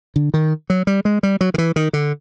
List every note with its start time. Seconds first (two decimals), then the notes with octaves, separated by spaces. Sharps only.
0.16 D3
0.34 D#3
0.70 F#3
0.87 G3
1.05 G#3
1.23 G3
1.41 F#3
1.54 D#3
1.58 E3
1.76 D#3
1.93 D3